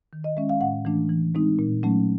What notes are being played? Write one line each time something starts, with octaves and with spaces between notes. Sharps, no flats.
D#3
D#5
G#3 C#4 E5
F5
A2 F#5
E3 A3 D4
E3
G#3 C4 D#4
A#2
F#3 A3 C#4